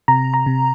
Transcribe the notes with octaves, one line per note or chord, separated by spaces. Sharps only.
C3 A#5
A#5
C3